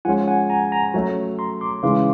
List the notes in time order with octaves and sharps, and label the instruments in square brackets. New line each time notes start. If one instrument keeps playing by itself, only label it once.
[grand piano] F3 G#3 C#4 [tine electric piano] F#5 G#5
[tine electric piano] F#5 G#5
G#5 A#5
G#5 A#5
[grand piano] F#3 A3 C#4
[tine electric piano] A#5 C6
C6 D6
[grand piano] C#3 E3 G#3 C#4 [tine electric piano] C6 D6